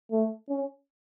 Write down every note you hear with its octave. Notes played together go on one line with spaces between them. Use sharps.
A3
C#4